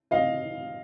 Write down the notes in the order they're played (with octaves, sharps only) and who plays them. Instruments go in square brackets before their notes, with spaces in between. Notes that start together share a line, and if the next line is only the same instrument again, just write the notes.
[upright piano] D#5 F5